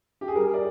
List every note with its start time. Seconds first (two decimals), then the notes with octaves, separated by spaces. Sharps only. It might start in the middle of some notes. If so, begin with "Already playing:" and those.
0.21 G4
0.28 G#4
0.36 G3 A#4
0.54 D5